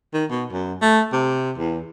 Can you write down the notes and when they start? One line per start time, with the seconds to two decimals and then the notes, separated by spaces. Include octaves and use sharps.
0.14 D#3
0.31 B2
0.52 F#2
0.82 A3
1.13 C3
1.58 E2